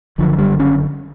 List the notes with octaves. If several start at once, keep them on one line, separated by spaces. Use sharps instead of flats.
F#1 F#2 D3 F3
G3
C#4